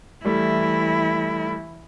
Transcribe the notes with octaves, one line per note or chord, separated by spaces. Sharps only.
E3 G3 A3 E4